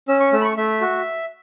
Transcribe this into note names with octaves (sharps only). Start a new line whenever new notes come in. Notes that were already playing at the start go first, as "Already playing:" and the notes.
C#4 E6
C#6
A3 E6
B5
C#6
A3 E5
F#4